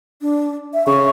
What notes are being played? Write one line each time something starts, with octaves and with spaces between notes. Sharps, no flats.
D4
E5
C#3 C#6